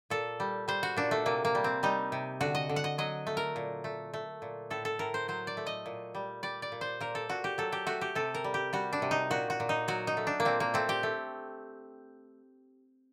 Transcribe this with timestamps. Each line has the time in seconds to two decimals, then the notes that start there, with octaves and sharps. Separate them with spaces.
0.10 A#2 A4
0.40 G3
0.68 G3 C5
0.83 F#4
0.97 A#2 D4
1.11 A3
1.26 C3 A#3
1.45 A#3
1.55 G3
1.64 C4
1.83 G3 D#4
2.12 C3
2.41 D3 F#4
2.55 D#5
2.69 D3
2.76 F#5
2.84 D#5
2.98 F#3 D#5
3.27 A3
3.37 A#4
3.56 A#2
3.84 A3
4.13 A3
4.42 A#2
4.70 A2 A4
4.85 A4
4.99 A2 A#4
5.14 C5
5.28 F#3 C5
5.47 D5
5.57 A3
5.67 D#5
5.86 A#2
6.15 G3
6.43 G3 D5
6.62 D5
6.72 A#2
6.81 C5
7.00 A#2 A#4
7.15 A4
7.29 A#2 F#4
7.44 G4
7.58 F#3 A4
7.72 G4
7.87 A3 F#4
8.01 G4
8.15 C3 A4
8.35 A#4
8.44 G3
8.54 G4
8.73 G3 F#4
8.93 D4
9.02 C3
9.11 D#4
9.30 A#2 F#4
9.50 F#4
9.60 A#2
9.69 D#4
9.88 F#3 F#4
10.07 D#4
10.17 A3
10.27 D4
10.40 A#3
10.45 A#2 C4
10.60 A#3
10.74 A3 C4
10.89 G4
11.03 A3